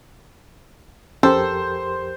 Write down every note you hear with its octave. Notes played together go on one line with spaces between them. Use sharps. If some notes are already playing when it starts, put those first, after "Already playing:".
F2 C#4 G4 A4 A#4 C5